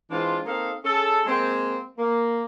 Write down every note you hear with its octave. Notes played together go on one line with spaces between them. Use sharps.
E3 G#3 C4 D4 F4
A#3 C4 D#4 A4 F5
C#4 G#4 A4
G#3 A#3 C4
A#3